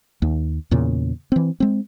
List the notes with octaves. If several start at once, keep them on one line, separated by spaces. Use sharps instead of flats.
D#2
E2 A#2 C#3
E3 C4
G#3 C4